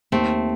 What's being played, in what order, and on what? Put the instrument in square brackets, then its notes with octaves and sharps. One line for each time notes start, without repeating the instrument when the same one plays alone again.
[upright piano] D#2 [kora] A3 C4